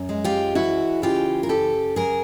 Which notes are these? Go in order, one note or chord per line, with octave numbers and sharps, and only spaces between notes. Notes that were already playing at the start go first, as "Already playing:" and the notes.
Already playing: F#2
G#3
F4 G4
E3 E4 F#4
C#3 F4 G4
A#4
F#2 G4 A4
F#2 G#4 A#4